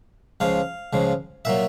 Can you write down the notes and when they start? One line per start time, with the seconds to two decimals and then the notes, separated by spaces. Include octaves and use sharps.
0.40 C#2 C#3 F3 F5
0.93 C#2 C#3 F3
1.45 A#2 F#3 E5